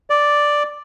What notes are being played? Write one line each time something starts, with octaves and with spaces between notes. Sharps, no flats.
D5